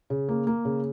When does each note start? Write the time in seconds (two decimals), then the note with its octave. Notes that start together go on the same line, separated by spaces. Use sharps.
0.10 C#3
0.29 A#3
0.47 A#3
0.65 C#3